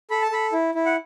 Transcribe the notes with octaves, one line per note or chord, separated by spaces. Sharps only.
A4 B5
A5
A4 B5
E4
E4
F#5